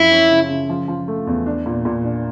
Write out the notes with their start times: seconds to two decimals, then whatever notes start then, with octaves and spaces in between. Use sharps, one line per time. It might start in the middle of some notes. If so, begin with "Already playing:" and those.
Already playing: F#2 F3 E4
0.11 C#4
0.30 C#3
0.49 C#3
0.70 F3
0.88 F3
1.08 A3
1.27 E2
1.46 D4
1.66 A#2
1.85 A#2
2.04 D4